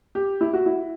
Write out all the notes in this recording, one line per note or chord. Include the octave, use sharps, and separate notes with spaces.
G4
E4
F#4
E4